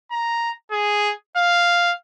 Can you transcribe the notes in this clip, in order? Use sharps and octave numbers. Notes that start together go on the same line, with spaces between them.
A#5
G#4
F5